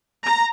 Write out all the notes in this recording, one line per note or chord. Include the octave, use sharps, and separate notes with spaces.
A#5